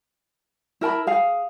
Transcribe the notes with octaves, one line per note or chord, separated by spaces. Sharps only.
E4 A#4 A5 B5
G#4 F5